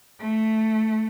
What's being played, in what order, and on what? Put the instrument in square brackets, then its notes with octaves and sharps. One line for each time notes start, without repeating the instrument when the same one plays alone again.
[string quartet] A3